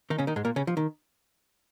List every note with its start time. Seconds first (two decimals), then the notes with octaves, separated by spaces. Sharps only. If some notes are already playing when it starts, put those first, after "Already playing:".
0.10 D#3 D#4
0.18 C#3 C#4
0.27 D#3 D#4
0.36 G#2 G#3
0.45 A#2 A#3
0.56 C#3 C#4
0.67 F3
0.77 D#3